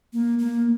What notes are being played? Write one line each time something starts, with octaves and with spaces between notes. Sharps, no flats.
A#3
A#3